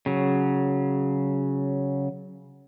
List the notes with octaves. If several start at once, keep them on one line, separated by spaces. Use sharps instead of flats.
C#3 F#3